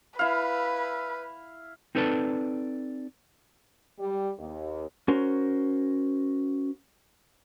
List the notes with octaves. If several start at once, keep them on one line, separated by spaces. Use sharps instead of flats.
E4 B4 F5
C4 D#4 A4 B4 D5 A5
G3
D#2
C#4 F#4 A#4 C5